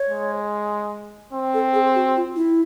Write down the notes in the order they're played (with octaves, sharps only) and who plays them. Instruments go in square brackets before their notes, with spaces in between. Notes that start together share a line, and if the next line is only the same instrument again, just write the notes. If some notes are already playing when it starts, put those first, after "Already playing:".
Already playing: [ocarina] C#5
[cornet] G#3
C4
[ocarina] A4
G#4
F#4
F4
E4